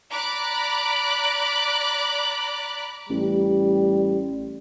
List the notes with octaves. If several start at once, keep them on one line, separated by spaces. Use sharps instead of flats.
D5 A#5 B5 D6 F#6
A1 G3